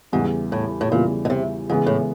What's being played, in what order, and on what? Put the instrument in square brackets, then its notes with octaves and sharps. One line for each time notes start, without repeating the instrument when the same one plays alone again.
[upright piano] E2 C#3 E3 G3 [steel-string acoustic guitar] G#2
[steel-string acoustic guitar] A2
A2
[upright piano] E2 C#3 E3 G3 [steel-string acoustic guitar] A#2
[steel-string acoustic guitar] B2
C3
[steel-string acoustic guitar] G#2 [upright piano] C#3 E3 G#3 B3
[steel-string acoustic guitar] A2